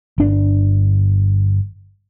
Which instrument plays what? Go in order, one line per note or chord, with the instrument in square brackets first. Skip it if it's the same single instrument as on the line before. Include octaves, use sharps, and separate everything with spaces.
[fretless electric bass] G1 D4